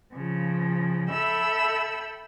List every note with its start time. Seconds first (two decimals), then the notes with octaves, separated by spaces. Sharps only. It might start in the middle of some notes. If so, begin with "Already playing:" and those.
0.14 C#3 F3
1.10 A4 E5 G5 B5 E6